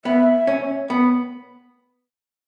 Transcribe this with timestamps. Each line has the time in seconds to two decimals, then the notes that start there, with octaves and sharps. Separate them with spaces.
0.05 B3 E5
0.47 C#4
0.90 B3